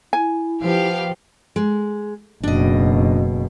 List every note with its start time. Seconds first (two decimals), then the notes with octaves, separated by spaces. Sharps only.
0.13 E4 G#5
0.62 F3 B3 G4 F5
1.56 G#3
2.43 F#1 B2 D4 D#5